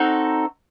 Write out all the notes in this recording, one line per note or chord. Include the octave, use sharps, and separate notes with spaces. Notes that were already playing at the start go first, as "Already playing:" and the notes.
Already playing: C4 D#4 F#4 A4